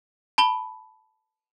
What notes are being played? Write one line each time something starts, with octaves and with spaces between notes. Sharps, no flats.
A5 B5 G7